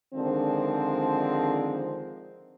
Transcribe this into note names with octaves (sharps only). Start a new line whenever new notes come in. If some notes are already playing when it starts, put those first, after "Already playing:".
D3 D#3 F3 G#3 C4 D4